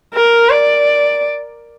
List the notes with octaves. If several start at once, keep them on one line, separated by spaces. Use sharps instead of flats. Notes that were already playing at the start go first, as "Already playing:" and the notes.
A#4
D5